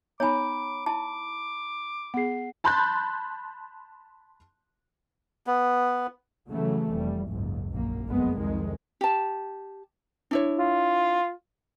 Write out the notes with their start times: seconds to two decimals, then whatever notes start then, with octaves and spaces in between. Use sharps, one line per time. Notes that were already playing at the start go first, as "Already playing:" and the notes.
0.20 B3 D#4 C#5 G#5 A#5 B5 D6
0.86 E4 A5 D6
2.14 B3 G#4 F#5 C7
2.64 A5 B5 C6 F#6 G6 A6
5.47 B3
6.50 C#3 E3 F#3 A3
6.92 F1 G3
7.29 F#1 C#2 G#2
7.71 A#1 F#2 A#3
8.08 F#1 F2 G#3 B3
8.39 C2 F2 D#3 G#3
9.01 G4 A5
10.31 D4 E4 C#5
10.59 F4